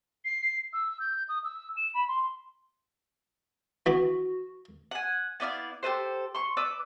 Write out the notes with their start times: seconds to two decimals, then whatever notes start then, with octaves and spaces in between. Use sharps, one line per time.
0.25 C7
0.73 E6
1.00 G6
1.29 D#6
1.44 E6
1.76 E7
1.94 B5
2.08 C6
3.86 E3 B3 F#4 D6
4.91 F#5 G#5
5.40 B3 E4 D5 F5
5.83 G4 A4 B4 C5
6.35 C6 C#6
6.57 B4 D5 D6 E6